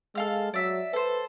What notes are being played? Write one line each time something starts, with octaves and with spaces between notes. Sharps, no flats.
G#3 A4 F5 F6
F#3 D5 E5
A4 B4 C5